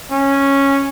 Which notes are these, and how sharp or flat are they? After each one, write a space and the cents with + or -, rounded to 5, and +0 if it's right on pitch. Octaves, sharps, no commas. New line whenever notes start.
C#4 -5